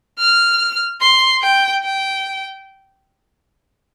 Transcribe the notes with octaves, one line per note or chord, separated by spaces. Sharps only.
F6
C6
G5
G5